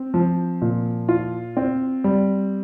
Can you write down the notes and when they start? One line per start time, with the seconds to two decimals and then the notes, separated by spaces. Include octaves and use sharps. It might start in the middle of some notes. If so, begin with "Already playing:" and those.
Already playing: C4
0.14 F3
0.62 A#2
1.08 F4
1.57 C4
2.04 G3